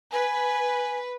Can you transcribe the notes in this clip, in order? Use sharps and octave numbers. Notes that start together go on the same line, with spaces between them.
B4 G#5